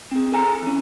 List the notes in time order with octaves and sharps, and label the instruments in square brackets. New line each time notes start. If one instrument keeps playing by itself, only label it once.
[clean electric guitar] C4 G#4
G#4 A4 G#5 A#5
E3 C#4